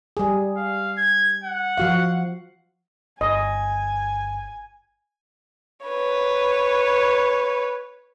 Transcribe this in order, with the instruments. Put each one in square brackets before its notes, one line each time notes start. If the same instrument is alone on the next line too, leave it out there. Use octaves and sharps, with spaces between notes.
[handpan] G3 G#4
[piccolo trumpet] F5
G#6
F#5
[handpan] F3 F#4 F5
[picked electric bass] G1 [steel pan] D#5 [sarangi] G#5
[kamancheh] B4 C#5